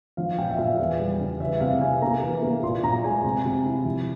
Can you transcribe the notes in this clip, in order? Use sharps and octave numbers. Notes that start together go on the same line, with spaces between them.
F3 F5
A#2 G5
E5
A#2 F5
E2
G3
C#3
E3 E5
C3 F5
C3 G#5
A#3 A#5
E3
A#3
A#2 C6
A#2 A#5
G#3 G#5
C3
C3
E4
F3